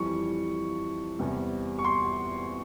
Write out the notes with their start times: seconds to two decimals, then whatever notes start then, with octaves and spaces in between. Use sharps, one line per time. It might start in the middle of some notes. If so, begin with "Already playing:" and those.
Already playing: F2 E3 G3 C#6
1.19 E2 C3 G3
1.79 C#6
1.84 C6